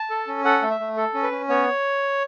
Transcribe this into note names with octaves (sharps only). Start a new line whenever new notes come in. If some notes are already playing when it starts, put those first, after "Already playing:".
Already playing: A5
A4
C#4
A4 F#5
A3
E5
A3
A4
C#4
B4
C#4
B3 C#5